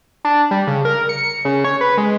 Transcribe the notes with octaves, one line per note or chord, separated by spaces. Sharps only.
D4
G3
C#3
A#4
C#7
C#3
C#5
B4
G#3